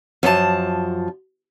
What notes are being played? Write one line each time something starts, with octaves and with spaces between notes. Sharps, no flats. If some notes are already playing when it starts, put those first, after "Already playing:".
F#2 F3 G#4 A5